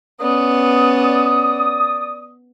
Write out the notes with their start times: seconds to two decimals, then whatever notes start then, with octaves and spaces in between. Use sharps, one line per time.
0.20 B3 C#4 D5 D#6